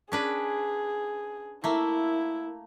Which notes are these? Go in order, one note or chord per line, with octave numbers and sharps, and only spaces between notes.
C#4 D4 G#4 B4
A3 A#3 E4